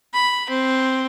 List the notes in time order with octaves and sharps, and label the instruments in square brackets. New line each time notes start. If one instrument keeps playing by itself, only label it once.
[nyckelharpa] B5
C4